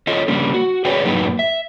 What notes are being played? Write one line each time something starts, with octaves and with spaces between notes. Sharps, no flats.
F4 A4 C#5 D#5
C#3 G3 A#3 D4
F#4
G#4 B4 C#5 D5 G5
F#2 A2 F#3 A#3 D#4 B4
E5